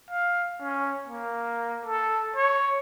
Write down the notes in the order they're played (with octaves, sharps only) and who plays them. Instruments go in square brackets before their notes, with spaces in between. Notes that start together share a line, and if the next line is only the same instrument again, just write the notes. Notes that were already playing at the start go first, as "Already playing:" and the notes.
[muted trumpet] F5
C#4
A#3
A4
C#5